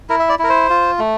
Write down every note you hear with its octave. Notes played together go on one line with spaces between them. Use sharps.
E4 A#4
E5
D5
E4 A#4
C5
F4
A3